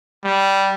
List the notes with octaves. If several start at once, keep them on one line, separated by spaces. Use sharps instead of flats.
G3